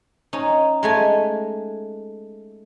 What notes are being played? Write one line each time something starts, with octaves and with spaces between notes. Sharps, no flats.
C#4 D#4
G#3 A3 G#5